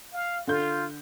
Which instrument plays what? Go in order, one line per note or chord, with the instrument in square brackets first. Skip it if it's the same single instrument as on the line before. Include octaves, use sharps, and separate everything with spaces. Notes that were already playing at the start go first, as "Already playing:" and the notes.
[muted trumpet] F5
[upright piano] D3 G6 [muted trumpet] F4